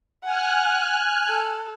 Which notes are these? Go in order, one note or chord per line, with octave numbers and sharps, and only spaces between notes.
F#5 G#5 F6 F#6
A4